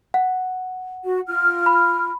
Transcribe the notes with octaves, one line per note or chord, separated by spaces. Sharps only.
F#5
F#4
F4 F6
B5